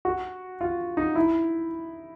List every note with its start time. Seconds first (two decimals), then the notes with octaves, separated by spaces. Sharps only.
0.05 F#4
0.61 F4
0.97 D#4
1.15 E4